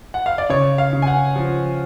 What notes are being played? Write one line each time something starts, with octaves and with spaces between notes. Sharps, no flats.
F#5
F5
D5
C#3 C#5
F5
C#3
G#5
F#5
F3